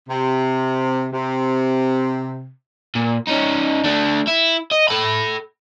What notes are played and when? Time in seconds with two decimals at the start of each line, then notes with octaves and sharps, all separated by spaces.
0.08 C3
1.12 C3
2.95 A#2
3.27 C#4 D#4
3.84 A3 D4
4.27 E4
4.71 D#5
4.88 A4 B5